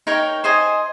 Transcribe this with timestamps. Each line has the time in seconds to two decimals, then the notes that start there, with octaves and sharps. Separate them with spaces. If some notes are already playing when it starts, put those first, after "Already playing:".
0.07 D#4 A#4 C#5 G5
0.44 C5 D#5 G#5